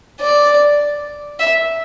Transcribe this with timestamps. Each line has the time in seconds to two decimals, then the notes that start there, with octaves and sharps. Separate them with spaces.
0.21 D5
1.40 E5